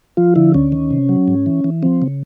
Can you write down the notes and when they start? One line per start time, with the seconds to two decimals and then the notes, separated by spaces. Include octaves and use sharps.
0.17 F3 F4
0.36 D3 E4
0.54 D2 C#4
0.72 D#3
0.91 C3
1.09 F#3
1.28 G#2
1.46 E3
1.64 E3
1.83 F3 C4
2.02 C#3